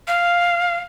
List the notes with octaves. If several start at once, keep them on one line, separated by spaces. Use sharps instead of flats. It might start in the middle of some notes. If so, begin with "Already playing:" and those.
F5